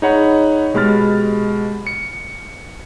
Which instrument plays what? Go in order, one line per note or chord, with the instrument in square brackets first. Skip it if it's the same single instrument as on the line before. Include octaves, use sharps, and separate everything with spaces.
[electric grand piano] D#4 G#4 C#5 F#5 B5
B2 G#3 G4 B5 F6 A6
C#7